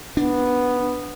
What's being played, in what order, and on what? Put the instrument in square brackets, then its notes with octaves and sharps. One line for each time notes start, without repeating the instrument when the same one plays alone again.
[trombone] B3 [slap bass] D4